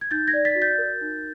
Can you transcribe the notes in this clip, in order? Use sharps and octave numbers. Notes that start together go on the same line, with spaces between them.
G#6
D#4 G6 A6
G#6 A#6
D5
A6 B6
F#4
G6 A6
A#4
D#4